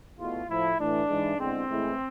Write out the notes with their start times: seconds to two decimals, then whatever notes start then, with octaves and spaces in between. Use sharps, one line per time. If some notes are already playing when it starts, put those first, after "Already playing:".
0.18 E2 B2 A3 F4
0.49 A2 F3 A3 E4
0.79 A2 E3 A3 D4
1.09 G#2 E3 G#3
1.38 E2 D3 G#3 C4
1.70 A2 E3 G#3